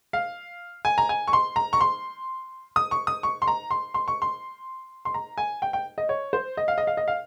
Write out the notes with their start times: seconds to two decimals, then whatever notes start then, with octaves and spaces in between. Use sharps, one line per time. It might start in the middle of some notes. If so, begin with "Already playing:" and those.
0.13 F5
0.85 G#5
0.98 A#5
1.09 G#5
1.28 C#6
1.33 C6
1.56 A#5
1.73 C#6
1.81 C6
2.76 D#6
2.91 C#6
3.07 D#6
3.23 C#6
3.42 C6
3.48 A#5
3.71 C6
3.94 C6
4.08 C#6
4.22 C6
5.05 C6
5.14 A#5
5.38 G#5
5.62 G5
5.73 G5
5.98 D#5
6.09 C#5
6.33 C5
6.57 D#5
6.68 F5
6.78 D#5
6.87 F5
6.97 D#5
7.08 F5